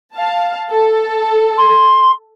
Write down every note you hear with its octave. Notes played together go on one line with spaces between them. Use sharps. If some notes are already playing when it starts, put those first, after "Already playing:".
F5 A5
A4
C6